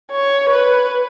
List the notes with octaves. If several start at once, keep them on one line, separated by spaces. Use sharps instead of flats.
C#5
B4